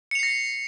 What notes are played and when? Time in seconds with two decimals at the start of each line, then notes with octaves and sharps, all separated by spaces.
0.11 C#7
0.15 F7
0.19 C7
0.23 A#6